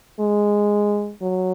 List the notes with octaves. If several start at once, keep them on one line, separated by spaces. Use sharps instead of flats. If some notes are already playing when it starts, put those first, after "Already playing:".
G#3
F#3